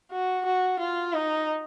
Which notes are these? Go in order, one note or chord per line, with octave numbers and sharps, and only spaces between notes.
F#4
F#4
F4
D#4